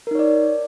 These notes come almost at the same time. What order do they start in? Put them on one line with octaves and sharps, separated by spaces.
A#4 D#4 C#5 D5